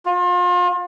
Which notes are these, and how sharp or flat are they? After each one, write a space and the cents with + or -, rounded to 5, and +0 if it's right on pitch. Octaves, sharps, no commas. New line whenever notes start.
F4 +35